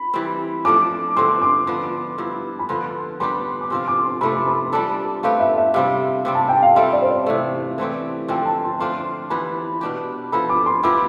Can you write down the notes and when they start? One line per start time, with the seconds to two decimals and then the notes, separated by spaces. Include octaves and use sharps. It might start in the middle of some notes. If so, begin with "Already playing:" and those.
Already playing: B5
0.14 E3 G3 C4
0.65 F3 A3 D4 D6
1.16 G2 D3 A3 C4 C6
1.42 D6
1.67 F3 B3 D4 C6
2.18 G2 F3 B3 E4
2.59 B5
2.69 D3 F3 B3 C6
3.20 G3 B3 D4 G4 C6
3.61 D6
3.70 C3 F3 C4 F4 C6
3.88 D6
4.05 C6
4.21 C3 F3 A3 C4 B5
4.35 C6
4.47 B5
4.72 G3 D4 A4 A5
5.23 A3 C4 G4 B4 F5
5.40 E5
5.57 E5
5.74 C3 G3 C4 F5
6.25 C3 G3 C4
6.35 A5
6.48 G5
6.62 F5
6.76 G3 C4 F4 A4 E5
6.92 D5
7.02 C5
7.10 D5
7.26 C3 E3 A3 E5
7.78 E3 A3 C4 G4
8.28 D3 F3 A3 C4 G5
8.45 A5
8.63 C6
8.80 A3 D4 F4 C5 C6
9.30 E3 B3 D4 G4 B5
9.81 B2 B3 D4 G4
10.32 F3 B3 E4 A4 B5
10.49 D6
10.66 C6
10.83 F3 B3 E4 G4 D6